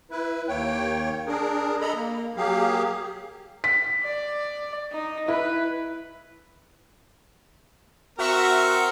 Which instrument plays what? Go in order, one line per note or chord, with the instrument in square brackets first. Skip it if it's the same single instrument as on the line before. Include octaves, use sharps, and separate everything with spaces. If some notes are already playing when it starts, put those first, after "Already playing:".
[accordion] E4 B4
D#2 A#3 C#5 G5
D4 G#4 A#4
A4 D#5 A#5 B5
A#3
F#3 A#3 G4 G#4 F5
[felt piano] B6
[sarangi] D5
D#4
[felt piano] E4 [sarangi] B4
[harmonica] C4 A#4 [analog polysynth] F#4 E5 C#6